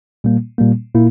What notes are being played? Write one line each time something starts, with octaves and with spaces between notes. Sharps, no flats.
A#2 G3 A#3
A#2 G3 A#3
A#2 A#3 E4